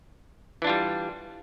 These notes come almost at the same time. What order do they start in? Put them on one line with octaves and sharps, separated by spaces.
E3 D4 F4 G3